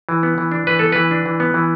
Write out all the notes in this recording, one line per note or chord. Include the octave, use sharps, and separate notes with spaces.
E3
B3
E3
D4
E3 B4
B3 A4
E3 B4
D4
E3
B3
E3